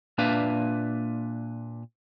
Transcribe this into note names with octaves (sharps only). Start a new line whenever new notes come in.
A#2 A#3 D4 B4 E5 F5